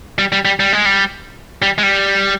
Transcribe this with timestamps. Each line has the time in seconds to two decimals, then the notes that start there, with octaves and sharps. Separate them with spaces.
0.18 G3
0.32 G3
0.45 G3
0.60 G3
0.73 G#3
0.86 G3
1.62 G3
1.78 G#3
1.83 G3